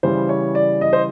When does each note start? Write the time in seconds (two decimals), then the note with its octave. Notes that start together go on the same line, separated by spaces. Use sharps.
0.03 C#3 E3 G3 C5
0.29 C#5
0.55 D5
0.81 D#5
0.93 C5